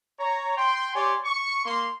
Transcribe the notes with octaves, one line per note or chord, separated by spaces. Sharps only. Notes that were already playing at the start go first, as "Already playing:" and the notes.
C#5 A#5
G5 C6
G4 C#5 D5 G#5 C6
C#6
A#3 C6